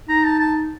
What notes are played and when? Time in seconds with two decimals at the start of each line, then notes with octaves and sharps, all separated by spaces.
0.08 D#4 A#5
0.24 A5
0.40 A5